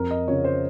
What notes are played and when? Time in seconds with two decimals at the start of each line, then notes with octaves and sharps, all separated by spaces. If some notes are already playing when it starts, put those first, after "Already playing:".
Already playing: F2 A#4
0.11 D#5
0.28 C#3 F3 C#5
0.45 C5